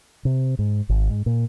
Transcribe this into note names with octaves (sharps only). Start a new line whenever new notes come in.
C3
G#2
G#1
G#2
A#2